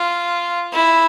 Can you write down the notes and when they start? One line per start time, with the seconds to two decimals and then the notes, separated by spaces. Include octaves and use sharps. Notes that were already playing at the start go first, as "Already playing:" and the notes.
Already playing: F4
0.72 E4